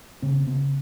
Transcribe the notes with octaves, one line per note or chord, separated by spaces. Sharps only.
C#3 C4
C#3 B3